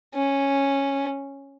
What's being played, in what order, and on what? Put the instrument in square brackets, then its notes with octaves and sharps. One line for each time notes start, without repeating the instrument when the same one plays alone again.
[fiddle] C#4